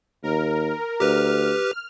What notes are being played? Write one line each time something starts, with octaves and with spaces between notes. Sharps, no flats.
D#2 A#4
D2 G4 B4 F6